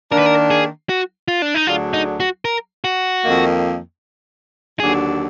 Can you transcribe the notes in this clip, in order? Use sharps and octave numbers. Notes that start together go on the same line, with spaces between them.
D#3 A#3 D4 A#4
B4
A#4
G#4
F#4
F4
D4
D#4
D2 D3 F#3 D4 F4 G#4
D#4
F#4
A#4
F#4
F2 D#3 A#3
D#2 D3 F#3 D4 G#4